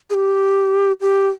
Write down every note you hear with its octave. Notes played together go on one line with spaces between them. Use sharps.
G#4
G4
G4